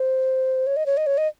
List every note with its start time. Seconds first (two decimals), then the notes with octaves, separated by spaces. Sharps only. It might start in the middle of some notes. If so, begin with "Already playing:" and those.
Already playing: C5
0.67 C#5
0.77 D#5
0.86 C#5
0.97 D#5
1.07 C#5
1.18 D#5